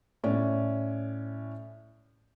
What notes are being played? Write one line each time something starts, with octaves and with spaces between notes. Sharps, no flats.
A2 C#4 D5